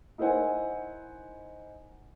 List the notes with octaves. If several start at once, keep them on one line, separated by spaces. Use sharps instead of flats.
D#4 E4 A#4 C5 F#5 G#5